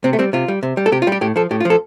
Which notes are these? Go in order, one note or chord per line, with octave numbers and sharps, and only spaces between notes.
C3 C4
A3
G3 C4
C3 F4
G3
C3
G3
A4
C3 G4
F4
G3 G4
A2 G4
F3 A4
A2 G4
F4
F3
A4